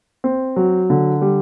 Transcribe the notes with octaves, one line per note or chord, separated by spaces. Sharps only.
C4
F#3
D3
G3